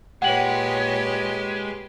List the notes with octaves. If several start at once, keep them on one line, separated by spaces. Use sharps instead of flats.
A#2 G#3 G4 B4 C#5 F#5 G5 F#7